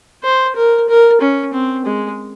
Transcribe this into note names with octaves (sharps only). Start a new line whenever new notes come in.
C5
A#4
A#4
C#4
C4
G#3